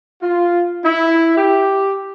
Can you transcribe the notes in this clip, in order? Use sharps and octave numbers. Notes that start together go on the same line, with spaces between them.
F4
E4
G4